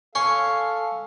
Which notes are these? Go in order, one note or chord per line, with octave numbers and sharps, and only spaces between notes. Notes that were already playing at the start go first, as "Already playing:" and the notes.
C#4 A4 F5 G#5 C6 C#6